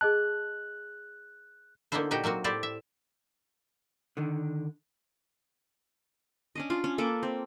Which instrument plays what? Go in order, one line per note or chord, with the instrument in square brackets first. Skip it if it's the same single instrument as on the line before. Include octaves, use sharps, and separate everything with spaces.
[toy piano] G#4 D#5 A5 [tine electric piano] F#6
[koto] D3 A#3 B3 D#4 E4 C5
A#2 D#4 F#4 G4 G5
F#3 A#3 C4 F#4
A2 E4 G4 C5 D5
E5
[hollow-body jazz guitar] D3 D#3
[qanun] C#4 D4 D#5
D4 F4
C#4
A#3 A4 B4 D6
C4